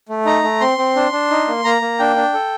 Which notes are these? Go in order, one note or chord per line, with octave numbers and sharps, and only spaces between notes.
A3
D#4 A#5
A3
C4 C6
C4
D4
D4
D#4
A#3
A#3 A#5
A#3
D4 G5
D4
A4